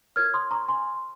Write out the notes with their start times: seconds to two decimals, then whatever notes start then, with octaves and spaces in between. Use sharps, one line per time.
0.16 F4 A#4 C#5 F6 G#6
0.34 C6 D#6
0.51 A#5 C#6
0.69 G#5 C6